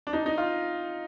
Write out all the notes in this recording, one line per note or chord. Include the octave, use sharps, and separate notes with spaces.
D4
D#4
D#4
F4